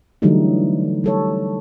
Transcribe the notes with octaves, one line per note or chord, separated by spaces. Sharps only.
D3 E3 F#3 G3 A3 D#4
G3 A4 C#5